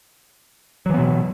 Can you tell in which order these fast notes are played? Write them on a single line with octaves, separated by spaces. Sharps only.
F#3 E3 B3 B2